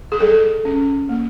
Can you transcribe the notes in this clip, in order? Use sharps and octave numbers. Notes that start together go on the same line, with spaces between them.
G#4
G3 A4
C#4
A#3